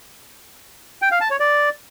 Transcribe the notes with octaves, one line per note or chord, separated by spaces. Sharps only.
G5
F5
A5
C#5
D5